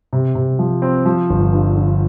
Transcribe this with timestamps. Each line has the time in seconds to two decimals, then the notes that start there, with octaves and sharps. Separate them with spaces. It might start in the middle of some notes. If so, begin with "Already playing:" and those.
0.13 C3
0.35 C3
0.59 F3
0.82 C4
1.05 F3
1.30 G1
1.53 G2
1.75 D3